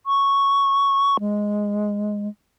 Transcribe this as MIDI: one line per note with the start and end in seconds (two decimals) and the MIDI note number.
0.06 1.17 85
1.20 2.28 56